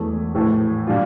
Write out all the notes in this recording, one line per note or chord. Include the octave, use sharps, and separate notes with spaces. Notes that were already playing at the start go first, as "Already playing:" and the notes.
Already playing: E1 E2 E3 A3
A#1 A2 E3 A3
A#2 G3 D4 F4